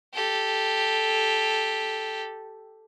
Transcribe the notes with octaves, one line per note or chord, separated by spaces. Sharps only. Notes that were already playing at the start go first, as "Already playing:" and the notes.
G4 A4